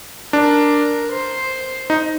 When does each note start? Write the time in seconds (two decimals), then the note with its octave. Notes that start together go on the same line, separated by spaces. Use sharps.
0.33 D4 A#4
1.12 C5
1.90 D#4